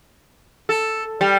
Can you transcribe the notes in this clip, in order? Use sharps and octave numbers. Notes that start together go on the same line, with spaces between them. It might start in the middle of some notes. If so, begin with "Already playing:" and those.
A4
G3